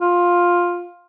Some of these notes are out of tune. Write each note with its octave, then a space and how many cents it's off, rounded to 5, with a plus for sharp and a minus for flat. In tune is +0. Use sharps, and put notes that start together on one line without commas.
F4 +10